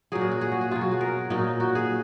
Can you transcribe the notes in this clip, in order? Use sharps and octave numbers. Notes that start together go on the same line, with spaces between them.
A#2 F#3 G#4
F#4
F#4
G#4
F#4
G#4
B2 F#3 F4
F#4
G#4
A#4
A#2 F#3 D#4
F#4
G#4